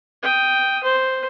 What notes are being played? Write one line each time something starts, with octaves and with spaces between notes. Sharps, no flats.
G5 D#6
C5